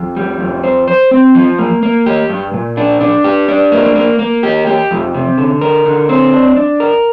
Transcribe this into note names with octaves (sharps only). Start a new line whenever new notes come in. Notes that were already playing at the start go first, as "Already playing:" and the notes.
Already playing: F2
G3
F2
C5
C5
C4
F3
A#3
A#3
G4
G2
A#2
D4
D4
G4
D4
A#3
A#3
A#3
G4
G4
F2
C3
D3
A#4
D3
C4
D4
D4
A#4